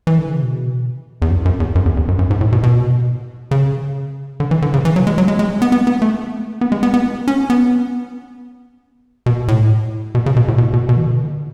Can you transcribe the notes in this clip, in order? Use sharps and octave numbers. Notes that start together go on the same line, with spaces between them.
E3
D3
C#3
B2
E2
F#2
F#2
E2
F#2
E2
E2
F#2
F#2
G#2
A2
B2
B2
C#3
D3
E3
D3
C#3
E3
F#3
G#3
F#3
G#3
G#3
B3
B3
B3
A3
B3
G#3
B3
B3
C#4
B3
B2
A2
B2
C#3
B2
A2
B2
B2
B2
E3
D3